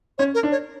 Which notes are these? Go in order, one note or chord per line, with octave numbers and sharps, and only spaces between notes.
C#4 C#5
A#4
D4
C#5